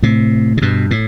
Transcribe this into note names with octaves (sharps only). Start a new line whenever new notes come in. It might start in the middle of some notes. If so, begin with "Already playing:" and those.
A2 C3
C3
G2 B2
A2